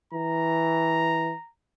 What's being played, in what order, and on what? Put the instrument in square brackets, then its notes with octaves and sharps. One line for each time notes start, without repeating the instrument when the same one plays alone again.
[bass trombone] E3 [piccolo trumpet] A#5